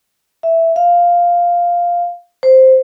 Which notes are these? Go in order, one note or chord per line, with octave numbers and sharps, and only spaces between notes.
E5
F5
C5